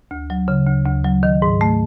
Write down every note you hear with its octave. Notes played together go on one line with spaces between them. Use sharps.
D2
F#3
C#3
D2
D2
F#3
D#3
G#2
A3